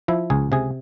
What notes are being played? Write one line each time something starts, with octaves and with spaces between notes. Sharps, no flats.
F3 E4
C#2 G#4
C3 G#4